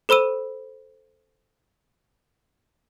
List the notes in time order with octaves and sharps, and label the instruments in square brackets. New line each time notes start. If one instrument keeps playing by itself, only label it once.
[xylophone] A4 C5 B5 E6 D#7